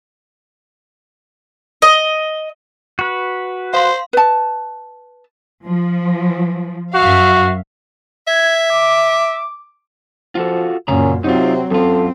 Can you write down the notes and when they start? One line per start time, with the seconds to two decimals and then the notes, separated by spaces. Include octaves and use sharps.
1.82 D#5
2.99 F#4 B4
3.74 C5 F5 C6
4.13 B4 A5
5.66 F3
6.94 F#2 F#4 E5 F5
8.28 E5 G#6
8.70 D6
10.35 F3 F4 F#4 A4
10.88 F#2 A#2 C#3 C#4 A#5
11.24 C3 F#3 C4 D#4 F4
11.71 F#2 C4 F4 A4